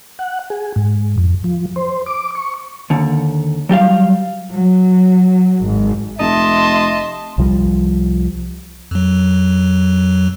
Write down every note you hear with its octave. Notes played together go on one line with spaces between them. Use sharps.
F#5
G#4
G#2
F2
F3
C5
D6
C#6
D#2 D3
F#3 G3 G4 F5
F#3
G#1
F1 D#5 E5 A5 C6
C2 F3 G3
F2 F#3